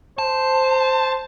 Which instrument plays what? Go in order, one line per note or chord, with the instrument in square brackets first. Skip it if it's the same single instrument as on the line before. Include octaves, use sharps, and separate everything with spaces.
[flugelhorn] C5 [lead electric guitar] A5